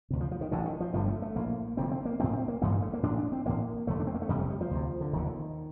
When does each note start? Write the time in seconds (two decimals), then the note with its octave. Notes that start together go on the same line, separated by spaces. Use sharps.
0.10 D2 C3
0.21 F3
0.31 F3
0.41 D#3
0.51 A1 A2 D3
0.66 D#3
0.80 F3
0.93 G1 G2 D3 F3
1.08 A3
1.22 A3
1.36 A#1 A2 A#3
1.77 F1 F2 D3 C4
1.91 C4
2.05 A#3
2.19 A#1 A2 C4
2.33 C4
2.48 A#3
2.61 A1 G2 D3 A3
2.72 G3
2.82 A3
2.93 A#3
3.03 A1 A2 D4
3.18 D4
3.32 C4
3.45 A1 A2 A#3
3.87 F1 F2 D3 A3
4.00 D4
4.07 C4
4.15 A#3
4.22 A3
4.29 G1 F2 C3 G3
4.39 A3
4.50 G3
4.61 F3
4.71 D2 C3
5.01 D3
5.13 F1 D#2 D3 D#3